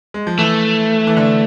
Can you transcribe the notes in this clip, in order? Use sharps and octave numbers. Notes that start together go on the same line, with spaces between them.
G#3
F3
E3 A3
E3
D3